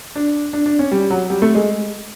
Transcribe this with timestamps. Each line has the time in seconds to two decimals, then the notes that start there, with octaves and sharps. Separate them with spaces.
0.15 D4
0.53 D4
0.66 D4
0.79 C#4
0.92 G3
1.10 F#3
1.30 G3
1.42 A3
1.55 G#3